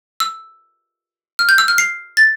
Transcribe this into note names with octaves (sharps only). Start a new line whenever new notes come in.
E6
F6
G6
E6
F6
C7
A6